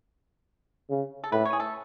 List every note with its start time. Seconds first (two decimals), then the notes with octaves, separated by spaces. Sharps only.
0.90 C#3
1.24 A4
1.32 A2 B4
1.45 C#5
1.53 G#4
1.60 A4